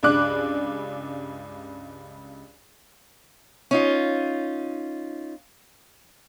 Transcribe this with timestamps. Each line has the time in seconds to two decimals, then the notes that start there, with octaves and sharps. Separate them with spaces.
0.03 C#2 G2 D5 D6 F#6
3.71 C#4 D#4 F4